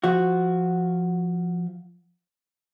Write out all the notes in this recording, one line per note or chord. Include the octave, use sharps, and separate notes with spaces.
F3 F#4